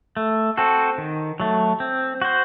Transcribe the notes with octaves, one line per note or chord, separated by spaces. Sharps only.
A3
C4 F#4 A4
D#3
F#3 A3
C4
F#4 C5